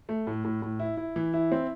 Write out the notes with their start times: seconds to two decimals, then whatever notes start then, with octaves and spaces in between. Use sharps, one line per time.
0.09 A3
0.27 A2
0.45 A2
0.62 A2
0.80 E4
0.97 E4
1.16 E3
1.34 E4
1.52 C4